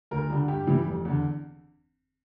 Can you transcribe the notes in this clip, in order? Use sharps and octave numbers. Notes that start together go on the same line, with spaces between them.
D2 A#4
D3 G3
G2 G4
E3 G3
F1
E2 D3